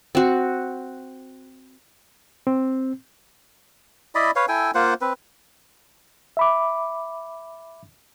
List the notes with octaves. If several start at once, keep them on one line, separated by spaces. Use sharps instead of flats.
C4 F#4
C4
E4 D5 D#5 B5
B4 C#5 F5
E4 A4 G5 G#5
A#3 F4 C5 F#5
C4 B4
E5 B5 D6